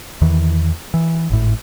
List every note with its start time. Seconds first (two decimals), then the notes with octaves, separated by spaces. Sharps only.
0.21 E2 D#3 E3
0.94 E3
1.30 G#1 A2